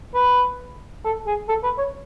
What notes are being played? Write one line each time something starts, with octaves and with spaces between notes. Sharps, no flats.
B4
A4
G#4
A4
B4
C#5